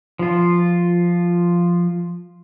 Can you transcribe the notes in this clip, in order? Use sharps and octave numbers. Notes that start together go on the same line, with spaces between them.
F3 F4